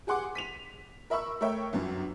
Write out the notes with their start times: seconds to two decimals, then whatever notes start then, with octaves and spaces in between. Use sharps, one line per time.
0.07 G4 G#4 F#5 C6 D6
0.35 B6 D#7 F7
1.10 A#4 E5 B5 C#6 E6
1.41 A3 A#4 C#5 E5 G5
1.73 G1 F#2